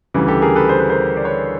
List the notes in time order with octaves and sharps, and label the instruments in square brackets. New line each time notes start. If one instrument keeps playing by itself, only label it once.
[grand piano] D2 C#3 E3 G3
G4 A4
G#4 A#4
A4 B4
C5
B4
A#4 C5
D5
B4 C#5